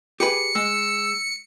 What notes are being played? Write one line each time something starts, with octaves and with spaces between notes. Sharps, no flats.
G4 G#4 B4 C#7
G#3 E6